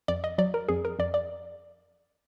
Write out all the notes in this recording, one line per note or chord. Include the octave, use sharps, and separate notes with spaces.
F2 D5
D#5
F#3 D5
A#4
F2 G#4
A#4
F2 D5
D5